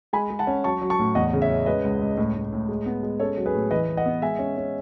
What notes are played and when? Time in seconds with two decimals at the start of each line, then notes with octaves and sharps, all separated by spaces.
0.13 G#3 G#5 B5
0.30 G#3
0.39 F#5 A5
0.47 C#4
0.64 F#3 A5 C#6
0.82 F#3
0.90 A5 C#6
0.99 A2
1.15 E2 D#5 F#5
1.33 C#3
1.41 C#5 E5
1.49 C#4
1.66 G#3 B4 D#5
1.84 C#2
2.01 C#2
2.17 A2
2.35 A2
2.53 A2
2.69 G#3
2.86 B3
3.03 G#3
3.20 C#4 A4 C#5
3.37 F#3
3.46 G#4 B4
3.55 A2
3.71 E3 B4 D#5
3.89 E3
3.97 D#5 F#5
4.06 B3
4.22 G#3 E5 G#5
4.39 C#4
4.57 C#4